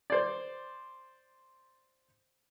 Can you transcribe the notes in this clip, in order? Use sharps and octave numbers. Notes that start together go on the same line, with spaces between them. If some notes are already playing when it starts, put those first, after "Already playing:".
C5 D5